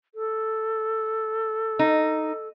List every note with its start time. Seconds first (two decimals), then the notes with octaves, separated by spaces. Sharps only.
0.15 A4
1.79 D#4